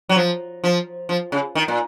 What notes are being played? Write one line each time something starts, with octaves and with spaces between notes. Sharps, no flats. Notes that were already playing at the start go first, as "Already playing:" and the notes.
F#3
F3
F3
F3
C#3
D#3
A#2